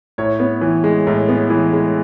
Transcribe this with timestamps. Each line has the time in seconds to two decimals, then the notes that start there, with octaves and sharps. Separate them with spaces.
0.18 A2 C#5
0.40 B3
0.61 E3
0.84 G#3
1.07 A2
1.29 B3
1.50 E3
1.73 G#3